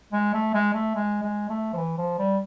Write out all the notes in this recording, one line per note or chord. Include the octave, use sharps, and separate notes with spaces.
G#3
A3
G#3
A3
G#3
G#3
A3
F3
E3
F3
G3